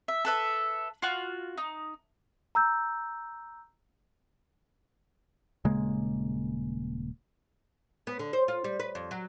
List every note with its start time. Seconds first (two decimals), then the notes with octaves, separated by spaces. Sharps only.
0.08 E5
0.25 A4 B4 E5
1.02 F4 F#4
1.58 D#4
2.55 A#5 E6 G6
5.65 D#1 C#3 G#3 A#3
8.07 B3
8.19 D3
8.33 C5
8.48 F4
8.64 G3
8.80 B4
8.95 F2
9.11 F#3